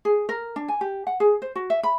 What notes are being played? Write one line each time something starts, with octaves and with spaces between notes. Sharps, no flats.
G#4
A#4
D4
G#5
G4
F#5
G#4
C5
F#4
E5
B5